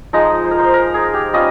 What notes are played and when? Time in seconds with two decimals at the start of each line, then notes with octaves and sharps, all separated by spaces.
0.13 F3 G#3 D#4 D#5
0.44 C5
0.51 A#4
0.59 C5
0.74 A#4
0.94 G#4
1.14 G4
1.33 G3 C#4 F4 D#5